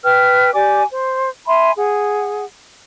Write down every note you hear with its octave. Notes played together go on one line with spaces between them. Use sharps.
B4 G5 F6
G4 D5 G#5 D6
C5
E5 G#5 B5 C6
G#4 F#5